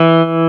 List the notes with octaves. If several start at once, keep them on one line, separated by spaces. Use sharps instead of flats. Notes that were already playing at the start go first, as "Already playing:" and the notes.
Already playing: E3